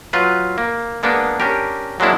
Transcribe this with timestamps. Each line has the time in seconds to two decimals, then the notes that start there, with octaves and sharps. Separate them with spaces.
0.13 F#3 F4 B4
0.58 A#3
1.03 G#3 A#3 B3 D4
1.40 C#4 D4 G4 A#4
2.00 F#3 G#3 A#3 D4 E4